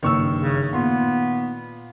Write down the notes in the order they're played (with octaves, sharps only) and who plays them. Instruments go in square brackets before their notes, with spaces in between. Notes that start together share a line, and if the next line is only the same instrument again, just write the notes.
[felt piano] F#1 G2 [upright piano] D#3 C#6 E6
[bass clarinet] C#3
[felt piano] A#2 C6 [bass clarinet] B3